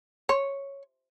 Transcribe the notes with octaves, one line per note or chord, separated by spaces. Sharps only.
C#5